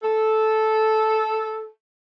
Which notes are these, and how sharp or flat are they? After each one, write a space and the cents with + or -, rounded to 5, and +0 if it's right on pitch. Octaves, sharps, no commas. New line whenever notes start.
A4 -10